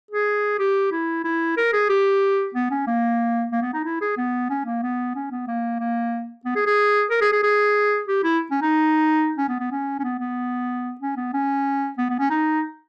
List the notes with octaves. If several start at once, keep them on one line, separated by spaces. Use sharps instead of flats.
G#4
G4
E4
E4
A#4
G#4
G4
B3
C#4
A#3
A#3
B3
D#4
E4
G#4
B3
C#4
A#3
B3
C#4
B3
A#3
A#3
B3
G#4
G#4
A#4
G#4
G#4
G#4
G4
E4
C#4
D#4
C#4
B3
B3
C#4
C#4
B3
B3
C#4
B3
C#4
B3
B3
C#4
D#4